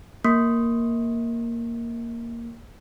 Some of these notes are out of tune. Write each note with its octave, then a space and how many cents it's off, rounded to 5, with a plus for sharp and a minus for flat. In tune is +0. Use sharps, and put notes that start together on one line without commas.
A#3 +0 C#6 -45